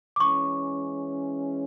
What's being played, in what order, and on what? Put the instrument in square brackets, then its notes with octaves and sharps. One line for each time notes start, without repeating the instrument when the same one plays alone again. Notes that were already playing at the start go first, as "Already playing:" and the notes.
[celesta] D6
[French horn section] E3 G#3 C#4 [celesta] C#6